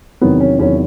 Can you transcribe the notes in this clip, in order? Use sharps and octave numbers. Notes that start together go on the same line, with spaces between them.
E2 C3 D#3 F#3 B3
C#4
E2 C3 D#3 F#3 C#4